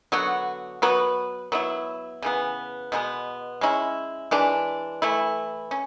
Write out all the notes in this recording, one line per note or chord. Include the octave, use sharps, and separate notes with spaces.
D3 F#3 B3 F#4
F#3 B3 F#4 B4
F#3 B3 E4
C#3 E3 B3
B2 G#3 B3
G#3 C#4 E4
E3 G#3 D4
E3 A3 E4
C#4